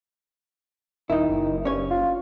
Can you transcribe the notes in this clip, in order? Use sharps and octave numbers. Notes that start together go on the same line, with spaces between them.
D#1 D#3 D#4 E4
F#1
G2 C#4 C#5
F4